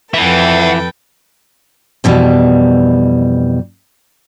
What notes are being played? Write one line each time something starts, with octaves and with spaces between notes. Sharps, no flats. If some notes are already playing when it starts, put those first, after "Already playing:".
F2 E3 A4 B4 E5 F#5 G5
F2 B2 E3 G3